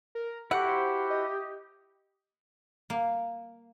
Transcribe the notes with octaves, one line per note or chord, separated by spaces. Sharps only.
A#4
E4 F#4 G4 A4 F#5
C5
D#5
A#3